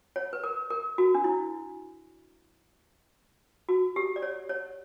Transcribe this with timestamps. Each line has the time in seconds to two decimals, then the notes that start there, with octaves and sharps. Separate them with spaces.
0.16 C#5
0.33 B4
0.44 A#4
0.70 A#4
0.98 F#4
1.15 D4
1.24 E4
3.69 F#4
3.96 G4
4.16 D5
4.22 C#5
4.49 C#5